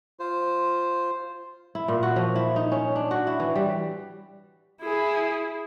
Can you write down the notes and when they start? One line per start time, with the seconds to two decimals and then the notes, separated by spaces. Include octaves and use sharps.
0.20 F4 C5
1.75 E4
1.88 A#2
2.03 F#4
2.16 F3
2.36 E4
2.56 D#4
2.72 C#4
2.96 D4
3.11 F#4
3.27 E4
3.40 E3
3.56 G3
4.82 E4 G#4